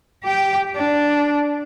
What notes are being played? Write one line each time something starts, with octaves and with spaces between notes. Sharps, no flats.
G4 G5
D4